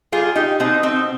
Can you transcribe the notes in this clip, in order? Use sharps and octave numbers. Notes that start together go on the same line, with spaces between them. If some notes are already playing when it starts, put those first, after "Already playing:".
G3 F4 G#4
D#4 G4
B2 C4 D#4
C4 D#4